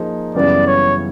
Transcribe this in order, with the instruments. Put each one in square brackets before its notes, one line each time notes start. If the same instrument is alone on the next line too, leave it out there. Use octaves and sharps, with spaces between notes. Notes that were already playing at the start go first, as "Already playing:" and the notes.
Already playing: [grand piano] F3 A#3 D#4 G#4
[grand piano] F#2 C#3 E3 G3 B3 [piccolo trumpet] D5
[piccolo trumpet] C#5